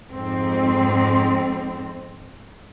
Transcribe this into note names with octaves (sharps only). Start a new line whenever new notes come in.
F2 G#2 C4